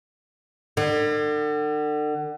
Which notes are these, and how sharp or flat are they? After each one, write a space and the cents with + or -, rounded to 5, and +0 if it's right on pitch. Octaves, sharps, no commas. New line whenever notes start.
D3 +40